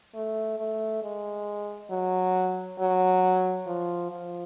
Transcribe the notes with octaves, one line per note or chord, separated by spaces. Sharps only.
A3
A3
G#3
F#3
F#3
F3
F3